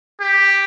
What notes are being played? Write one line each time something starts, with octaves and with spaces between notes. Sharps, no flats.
G4